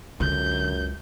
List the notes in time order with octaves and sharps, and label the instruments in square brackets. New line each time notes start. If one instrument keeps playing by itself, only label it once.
[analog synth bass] C#2 [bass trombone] F#2 [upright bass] D3 [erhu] G6